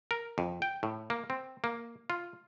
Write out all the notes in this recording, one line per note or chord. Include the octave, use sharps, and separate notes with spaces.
A#4
F2
G5
A2
A#3
C4
A#3
F4